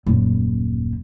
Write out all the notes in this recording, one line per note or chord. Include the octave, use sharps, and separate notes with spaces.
D#1 F#2